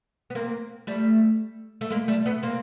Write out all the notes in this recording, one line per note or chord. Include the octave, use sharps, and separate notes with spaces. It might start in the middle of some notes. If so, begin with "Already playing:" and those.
B3
A#3 C4
G3 A3
A3
G#3 A#3
G3 A3
A3 B3
A#3 C4